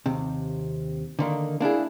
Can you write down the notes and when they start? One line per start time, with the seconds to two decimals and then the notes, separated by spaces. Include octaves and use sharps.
0.06 D#2 C3
1.19 D3 D#3 A#3
1.60 A#3 D4 E4 G#4